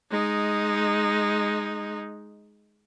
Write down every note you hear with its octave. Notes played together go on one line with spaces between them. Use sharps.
G#3 D#4